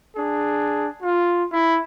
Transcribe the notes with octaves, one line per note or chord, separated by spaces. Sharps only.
D4 G#4
F4
E4